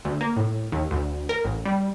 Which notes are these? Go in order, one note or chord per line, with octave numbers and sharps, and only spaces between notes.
D2
A#3
A2
D#2
D2
A#4
A1
G3